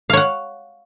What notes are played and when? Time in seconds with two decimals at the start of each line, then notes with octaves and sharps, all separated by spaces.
0.10 F5
0.13 C#5
0.17 F#5